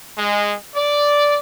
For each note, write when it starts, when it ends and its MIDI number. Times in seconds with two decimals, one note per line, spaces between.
0.17 0.53 56
0.76 1.37 74